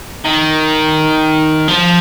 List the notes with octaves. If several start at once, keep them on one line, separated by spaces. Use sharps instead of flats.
D#3
F3